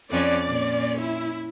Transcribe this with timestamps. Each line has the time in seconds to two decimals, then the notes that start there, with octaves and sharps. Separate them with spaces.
0.12 F2 C#4 D5
0.47 A#2 C#4
1.01 E4